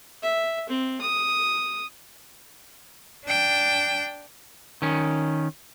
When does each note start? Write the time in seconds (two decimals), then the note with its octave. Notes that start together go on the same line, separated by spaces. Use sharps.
0.22 E5
0.69 C4
1.01 D#6
3.24 D4 G5
4.82 D#3 C#4